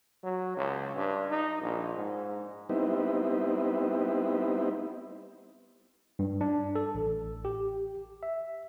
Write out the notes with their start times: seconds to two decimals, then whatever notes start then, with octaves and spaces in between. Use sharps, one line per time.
0.23 F#3
0.57 C#2
0.96 G2
1.30 D#4
1.61 A#1
1.96 G#2
2.69 G3 B3 C4 D#4 E4
6.19 G2
6.41 D4
6.75 A4
6.95 A1
7.45 G4
8.23 E5